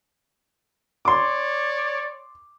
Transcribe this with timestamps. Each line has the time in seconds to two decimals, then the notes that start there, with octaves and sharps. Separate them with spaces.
1.05 C#5 D5 C6 D6